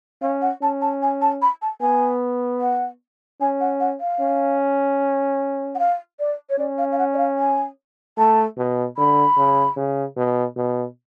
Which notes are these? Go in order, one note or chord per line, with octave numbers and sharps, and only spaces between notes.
C#4 F5
F#5
C#4 A5
A5
G#5
A5
B5
A5
B3 G#5
F#5
C#4 G#5
F#5
F#5
F5
C#4
F#5
F5
D5
C#5
C#4 D5
F5
F5
F#5
D5
F5
G#5
A3 A5
B2
D3 B5
C#3
C#3
B2
B2